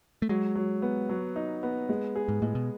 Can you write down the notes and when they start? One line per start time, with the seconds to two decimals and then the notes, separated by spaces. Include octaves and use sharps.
0.22 A3
0.29 F#3 G#3
0.55 F#3
0.82 B3
1.09 F#3
1.36 D#4
1.63 B3
1.89 G#3
2.16 G#4
2.29 G#2
2.42 A2 G#3
2.55 B2